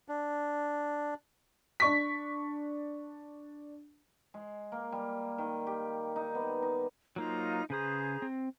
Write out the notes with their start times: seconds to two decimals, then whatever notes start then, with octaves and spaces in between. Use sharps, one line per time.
0.09 D4
1.80 D4 C#6 B6
4.34 G#3
4.72 A#3
4.92 G3
5.38 D#3
5.67 G4
6.16 D#4
6.35 B3
6.62 D#4
7.16 F#3 A#3 D#4 F4 C5 A#5
7.70 C#3 G#4 B4 C5 A#5 D#6
8.22 C4